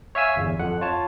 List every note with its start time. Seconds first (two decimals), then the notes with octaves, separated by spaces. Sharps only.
0.15 C#5 E5 F5 G#5 E6 B6
0.36 G1 E2
0.59 F2 F#5
0.81 F4 C#5 A5